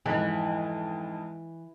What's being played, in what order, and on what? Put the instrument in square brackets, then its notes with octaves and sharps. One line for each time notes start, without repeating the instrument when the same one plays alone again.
[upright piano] F2 G#2 [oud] E3